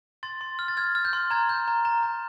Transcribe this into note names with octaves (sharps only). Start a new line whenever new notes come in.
C6 A6
C6
F6
A6
F6 G#6
F6
G6
C6
A#5 G#6
G6
A#5
A#5
A#5